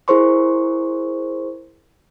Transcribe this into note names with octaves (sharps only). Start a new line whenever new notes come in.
E4 G#4 A#4 C5 C6 C#6